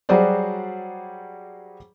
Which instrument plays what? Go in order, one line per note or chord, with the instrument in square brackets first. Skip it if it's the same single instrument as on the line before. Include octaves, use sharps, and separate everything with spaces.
[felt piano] F#3 G3 F#4 G#4 C5 D5